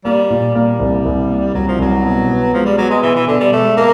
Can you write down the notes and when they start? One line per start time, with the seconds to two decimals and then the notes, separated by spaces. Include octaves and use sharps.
0.05 G3 A#3
0.30 A#2
0.55 G3 A#3
0.79 C2
1.05 C2
1.29 A#3
1.54 C2 F#3
1.68 F3
1.79 C2 F#3
2.04 B2
2.29 B3
2.53 F3 G#3
2.66 G3
2.78 F#3 B3
2.90 G#3
3.02 B2 E3
3.15 E3
3.28 B2 D3
3.40 G3
3.52 G#3 A3
3.77 B2 A#3